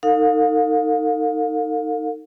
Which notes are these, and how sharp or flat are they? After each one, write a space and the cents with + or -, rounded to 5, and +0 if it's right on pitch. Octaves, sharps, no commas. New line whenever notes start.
D#4 +0 A4 +45 F5 +35